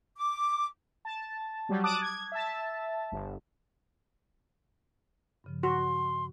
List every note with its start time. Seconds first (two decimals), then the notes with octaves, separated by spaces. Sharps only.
0.16 D6
1.05 A5
1.69 F#3 G3
1.84 A5 D6 D#6 F#6
2.02 G#6
2.32 E5 A5
3.12 G1
5.44 G2 C#3 F3
5.63 F#4 C6